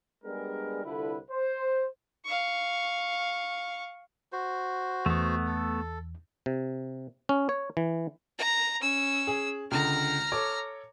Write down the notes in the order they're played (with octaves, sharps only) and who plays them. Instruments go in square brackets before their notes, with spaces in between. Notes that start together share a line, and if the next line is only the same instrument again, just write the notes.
[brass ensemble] G3 G#3 B3 D4 G#4 A#4
C2 D3 E4 F4 A4 B4
C5
[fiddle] F5 C#6
[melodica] F#4 C5
[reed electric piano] E2 [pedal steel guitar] A3 B3
[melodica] A4
[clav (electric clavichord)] C3
C#4
C#5
E3
[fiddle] A#5
C#4 E6
[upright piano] G#4
[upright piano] C#2 D3 [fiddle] A#5 F6
[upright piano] A4 C#5 D6